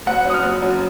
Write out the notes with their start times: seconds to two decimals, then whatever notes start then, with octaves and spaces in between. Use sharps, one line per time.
0.06 F#1 F#5
0.25 F#2 D#6
0.34 F6
0.43 F#1
0.62 F#2